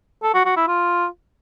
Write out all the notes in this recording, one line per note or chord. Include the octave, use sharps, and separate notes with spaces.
A4
F#4
F#4
E4
F4